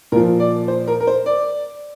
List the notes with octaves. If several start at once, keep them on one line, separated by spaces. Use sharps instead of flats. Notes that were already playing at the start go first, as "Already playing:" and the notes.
A#2 F3 A#4
D5
C5
A#4
A#4
C5
D5